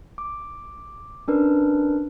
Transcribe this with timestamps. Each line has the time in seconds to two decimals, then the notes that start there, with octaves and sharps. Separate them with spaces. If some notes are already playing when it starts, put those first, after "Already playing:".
0.18 D6
1.28 C#4 D4 A#4 B4